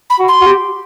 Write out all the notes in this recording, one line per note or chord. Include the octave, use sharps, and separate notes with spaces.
B5
F#4
C6
F#4
G4